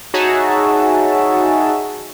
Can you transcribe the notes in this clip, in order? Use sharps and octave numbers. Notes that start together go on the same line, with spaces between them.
D#4 F#4 G#4 C#5 E5 A5